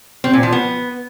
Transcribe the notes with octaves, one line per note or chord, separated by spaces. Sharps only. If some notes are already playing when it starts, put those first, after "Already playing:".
C4
A#2
F3
B3